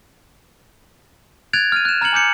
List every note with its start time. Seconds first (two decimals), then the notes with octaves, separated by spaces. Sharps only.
1.53 F#6 G#6 A6 D7 F7
1.72 F6 D#7
1.85 F#6 E7
2.01 A#5 F6 F#6 G#6 C#7 F#7
2.13 G#5 D6 G6 C#7